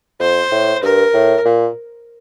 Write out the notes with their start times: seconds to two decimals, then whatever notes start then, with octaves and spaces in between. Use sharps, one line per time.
0.20 F2 C5
0.52 A2
0.83 G2 A#4
1.14 A2
1.45 A#2